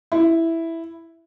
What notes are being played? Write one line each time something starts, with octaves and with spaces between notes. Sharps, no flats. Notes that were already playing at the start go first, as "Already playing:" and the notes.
E4